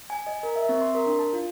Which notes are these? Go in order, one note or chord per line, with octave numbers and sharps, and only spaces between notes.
G#5
D#5
A#4
E5
C4
C6
A#4
D4
A5
F4